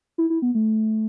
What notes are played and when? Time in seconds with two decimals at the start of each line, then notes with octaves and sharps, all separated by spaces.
0.18 E4
0.30 E4
0.42 B3
0.55 A3